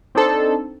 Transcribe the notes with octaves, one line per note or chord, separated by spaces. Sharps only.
C4 D4 D#4 A4 C5